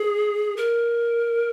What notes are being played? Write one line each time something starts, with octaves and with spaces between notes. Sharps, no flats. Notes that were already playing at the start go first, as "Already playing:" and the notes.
Already playing: G#4
A#4